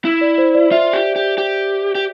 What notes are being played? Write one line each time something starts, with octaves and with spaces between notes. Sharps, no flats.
E4
D5
C5
D5
F4 E5
G4
G4
G4
G4